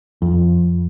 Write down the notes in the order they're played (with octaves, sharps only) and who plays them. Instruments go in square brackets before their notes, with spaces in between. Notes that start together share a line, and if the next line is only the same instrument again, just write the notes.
[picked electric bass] F2